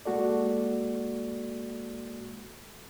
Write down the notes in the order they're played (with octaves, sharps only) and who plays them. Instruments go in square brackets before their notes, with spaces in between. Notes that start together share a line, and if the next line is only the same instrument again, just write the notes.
[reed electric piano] G#3 A#3 F#4 A4 D5